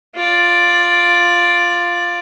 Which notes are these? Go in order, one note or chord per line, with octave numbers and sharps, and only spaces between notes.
F4 D5